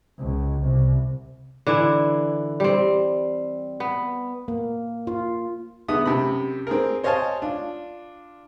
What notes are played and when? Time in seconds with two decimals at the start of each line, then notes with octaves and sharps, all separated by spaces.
0.18 C#2
0.62 C2
1.67 D3 E3 E4
2.60 G3 C4
3.80 B3
4.48 A#3
5.07 F4
5.88 D3 G#3 B3 E5 D#6
6.05 F#2 C3 B5
6.67 C4 G#4 A#4
7.03 C5 C#5 D#5 F5 G#5 A5
7.42 D4 F4